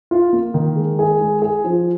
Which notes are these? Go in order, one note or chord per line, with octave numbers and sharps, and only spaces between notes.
F4
A#3
D#3
G#3
G#4
G#3
G#4
F3